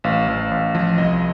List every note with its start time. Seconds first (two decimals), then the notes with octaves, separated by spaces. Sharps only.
0.04 A1 F5
0.28 A1
0.51 A1
0.75 F3
0.98 C2 D#5